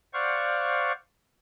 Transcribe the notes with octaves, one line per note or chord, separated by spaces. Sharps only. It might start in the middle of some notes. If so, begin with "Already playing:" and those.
C5 D5 F5 F#5 C#6